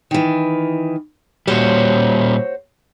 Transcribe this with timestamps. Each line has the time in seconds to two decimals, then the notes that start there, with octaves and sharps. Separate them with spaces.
0.11 D#3 E3
1.47 A#2 G3 F#4 C5 C#5